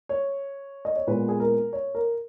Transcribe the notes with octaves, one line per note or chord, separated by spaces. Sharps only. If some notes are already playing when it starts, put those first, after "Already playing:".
C#5
D#5
C#5
A#2 G#3 B3 B4
G#4
A#4
C#5
A#4